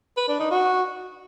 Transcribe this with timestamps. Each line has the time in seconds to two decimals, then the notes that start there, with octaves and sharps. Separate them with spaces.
0.17 B4
0.28 D4
0.40 D#4
0.51 F#4